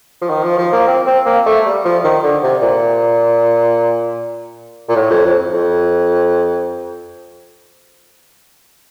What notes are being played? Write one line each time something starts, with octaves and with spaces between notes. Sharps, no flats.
F3
D#3
F3
F3
A#3
C4
C4
A#3
A3
G3
F3
D#3
D3
C3
A#2
A#2
A2
F2
F2
F2